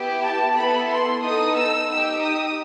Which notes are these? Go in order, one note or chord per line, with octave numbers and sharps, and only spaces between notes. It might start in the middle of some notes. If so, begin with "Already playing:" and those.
Already playing: B3 E4 G4
A5
B3 E4 A4 B5
C6
B3 D#4 A4 D#6
E6
D#4 G4 E6
D#6